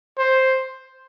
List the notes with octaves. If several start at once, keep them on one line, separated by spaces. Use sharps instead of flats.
C5